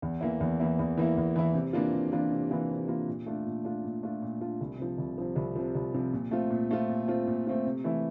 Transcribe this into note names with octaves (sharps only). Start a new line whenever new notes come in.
E2
E3 A#3 E4
E2
E3 A#3 E4
E2
E3 A#3 E4
E2
E3 A#3 E4
C3
E3 A#3 D4 F4
C3
E3 A#3 D4 F4
C3
E3 A#3 D4 F4
C3
E3 A#3 D4 F4
A#2
A3 D4 F4
A#2
A3 D4 F4
A#2
A3 D4 F4
A#2
A3 D4 F4
C2
C3 F3
C2
C3 F3
C2
C3 F3
C2
C3 F3
A#2
A3 C4 F4
A#2
A3 C4 F4
A#2
A3 C4 F4
A#2
A3 C4 F4
C3
E3 A3 E4